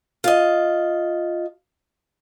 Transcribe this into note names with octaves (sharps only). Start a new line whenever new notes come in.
F4 D#5